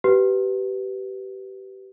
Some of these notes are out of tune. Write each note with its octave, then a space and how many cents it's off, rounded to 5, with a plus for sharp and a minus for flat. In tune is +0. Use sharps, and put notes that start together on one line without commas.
G4 -25 B4 +0